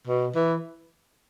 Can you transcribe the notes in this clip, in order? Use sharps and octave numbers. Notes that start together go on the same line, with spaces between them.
B2
E3